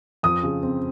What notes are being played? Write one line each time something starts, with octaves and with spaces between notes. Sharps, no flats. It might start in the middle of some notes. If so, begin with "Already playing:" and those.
F2 D#6
C#3
C4